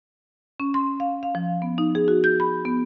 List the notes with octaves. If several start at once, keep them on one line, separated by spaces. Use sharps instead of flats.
C#4
C6
F5
F5
F3
B3
D#4
G#4
F#4
G6
B5
B3